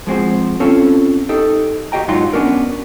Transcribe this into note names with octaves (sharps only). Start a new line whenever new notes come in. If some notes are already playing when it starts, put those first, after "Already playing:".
F3 G#3 C4 F#4 C5
C4 C#4 F4 A4
D#4 G4 A4
F#4 G4 D#5 G5 A#5
G#2 F#3 D#4 F4 C6
B3 C#4 D4 F#4 A#4